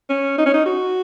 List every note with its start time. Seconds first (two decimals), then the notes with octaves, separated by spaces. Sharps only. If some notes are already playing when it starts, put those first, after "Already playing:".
0.09 C#4
0.38 D#4
0.46 C#4
0.54 D#4
0.65 F#4